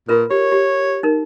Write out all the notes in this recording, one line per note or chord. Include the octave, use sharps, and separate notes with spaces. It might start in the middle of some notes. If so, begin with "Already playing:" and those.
A#2 F4 A#4 B4
G4 C#5
G4
D#4 A#4